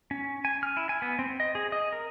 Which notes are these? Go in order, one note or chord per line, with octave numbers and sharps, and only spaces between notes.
C#4
G#5
F6
E4
G#5
B3
C4
D#5
G#4
D#5
A#4